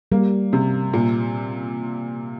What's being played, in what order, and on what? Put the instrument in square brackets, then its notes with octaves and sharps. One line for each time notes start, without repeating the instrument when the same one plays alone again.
[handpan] G3 [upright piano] A#3
[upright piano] C3
A#2